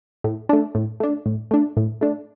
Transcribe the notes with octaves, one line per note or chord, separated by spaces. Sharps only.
A2
A3 D4
A2
A3 D4
A2
A3 D4
A2
A3 D4